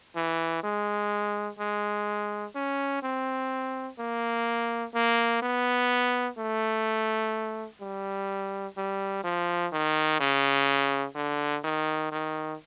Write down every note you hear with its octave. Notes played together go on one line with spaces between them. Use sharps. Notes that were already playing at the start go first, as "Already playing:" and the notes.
E3
G#3
G#3
C#4
C4
A#3
A#3
B3
A3
G3
G3
F3
D#3
C#3
D3
D#3
D#3